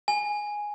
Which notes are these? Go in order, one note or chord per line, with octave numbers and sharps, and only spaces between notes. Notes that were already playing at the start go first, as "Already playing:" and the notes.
G#5